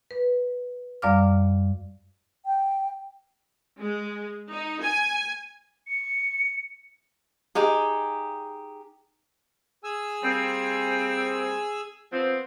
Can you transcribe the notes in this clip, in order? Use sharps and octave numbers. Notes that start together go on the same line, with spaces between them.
B4
F#2 G3 D5 F5 D6 F6
G5
G#3
D#4
G#5
C#7
D#4 G4 G#4
G#4 G#5 E6
G3 A#3 C4
F3 B3 C4